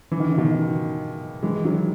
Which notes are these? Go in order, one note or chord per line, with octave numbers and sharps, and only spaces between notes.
E3
D#3
C#3
B2 D#3
E3 G#3
D#3 F#3